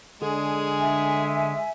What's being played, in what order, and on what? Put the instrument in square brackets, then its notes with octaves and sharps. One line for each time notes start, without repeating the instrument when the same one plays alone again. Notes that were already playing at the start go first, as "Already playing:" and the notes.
[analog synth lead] D3 [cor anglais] G#3 [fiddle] G#4
[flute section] E5 G#5